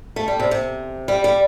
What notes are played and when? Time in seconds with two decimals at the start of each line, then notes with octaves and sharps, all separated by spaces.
0.16 A3
0.28 G3
0.40 C3
0.51 C3
1.08 G3
1.24 G3